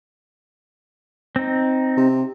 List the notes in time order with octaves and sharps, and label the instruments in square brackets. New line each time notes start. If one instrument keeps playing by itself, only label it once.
[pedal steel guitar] C4 D#4
[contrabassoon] C3